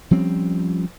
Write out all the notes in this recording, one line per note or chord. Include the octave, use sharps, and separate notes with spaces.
F3 G3 C4 C#4